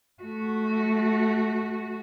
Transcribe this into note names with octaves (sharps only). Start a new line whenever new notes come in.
A3 F#4